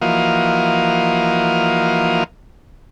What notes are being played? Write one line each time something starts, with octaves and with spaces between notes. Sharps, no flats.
E3 F3 A#3 F#4 D#5 F5